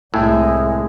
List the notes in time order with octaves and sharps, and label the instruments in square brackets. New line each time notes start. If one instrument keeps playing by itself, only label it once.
[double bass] C2 [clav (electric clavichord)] A2 [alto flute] G#3 [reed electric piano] E5 G#5 E6